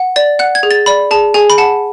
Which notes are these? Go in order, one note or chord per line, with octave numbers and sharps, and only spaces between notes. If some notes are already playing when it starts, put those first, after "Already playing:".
Already playing: F#5
D5 A6
F#5 F#6
G#6
G#4
A6
D5 B5
G#4 A5
G#4 G#5
B5
F#5 A5